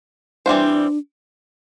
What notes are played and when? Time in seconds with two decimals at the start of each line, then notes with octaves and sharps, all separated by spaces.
0.46 E3 G3 C4 D4 F#4 C5